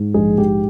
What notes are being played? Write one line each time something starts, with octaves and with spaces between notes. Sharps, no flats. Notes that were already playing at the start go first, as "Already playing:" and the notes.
Already playing: G#2
A#1 G#3 G#4
G#2 G4